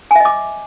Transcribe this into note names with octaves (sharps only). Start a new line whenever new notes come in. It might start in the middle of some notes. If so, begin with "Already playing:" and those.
D#5 E5 G#5 D6